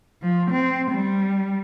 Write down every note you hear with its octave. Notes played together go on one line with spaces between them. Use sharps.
F3
C4
G3